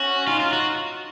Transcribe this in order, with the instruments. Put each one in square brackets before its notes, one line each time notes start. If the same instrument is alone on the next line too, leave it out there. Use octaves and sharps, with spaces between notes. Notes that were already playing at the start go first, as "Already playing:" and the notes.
Already playing: [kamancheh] C#4 [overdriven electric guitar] F#4
[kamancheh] D#4 [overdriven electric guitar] F4
[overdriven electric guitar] F4
F#4